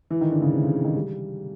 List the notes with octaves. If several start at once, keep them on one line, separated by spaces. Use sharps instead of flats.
E3
D#3
D3
C#3
C3
C#3
D3
D#3
G3